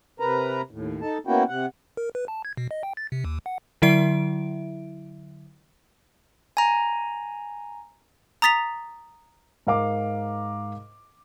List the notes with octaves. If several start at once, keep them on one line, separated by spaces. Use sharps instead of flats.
C3 A#4 B4 A#5
D#2 A2
D#4 A4 A5
A#3 B3 C#4 E4 F#4 G5
C3 F#5
A#4
B4
A5
G#6
B2
D#5
G5
A6
C3
D#2
F#5
D3 F#3 E4 E5 D7
G#5 A#5
A#5 D#6 A6 B6 F7
G#2 A#4 F5 D6